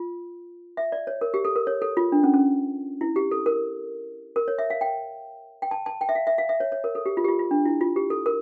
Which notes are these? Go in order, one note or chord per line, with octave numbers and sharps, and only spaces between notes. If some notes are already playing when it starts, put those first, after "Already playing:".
Already playing: F4
E5
D5
C#5
A#4
G4
A4
A#4
C#5
A4
F4
D4
C#4
C#4
E4
G4
A4
A#4
A#4
C#5
E5
F5
G5
G5
A5
A5
G5
E5
F5
E5
F5
E5
C#5
C#5
A#4
A4
G4
F4
G4
F4
F4
D4
E4
F4
G4
A4
A#4